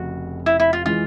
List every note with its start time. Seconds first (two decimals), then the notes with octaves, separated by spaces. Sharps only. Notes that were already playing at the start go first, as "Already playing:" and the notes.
Already playing: F1 F2 C#3 F#4
0.46 E4
0.60 E4
0.73 F4
0.85 E3 G#3 F4